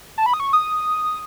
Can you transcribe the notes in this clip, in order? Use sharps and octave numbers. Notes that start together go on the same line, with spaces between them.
A5
B5
D#6
C#6
D#6